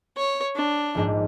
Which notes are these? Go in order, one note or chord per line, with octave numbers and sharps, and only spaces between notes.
C#5
D4
A#1 G#2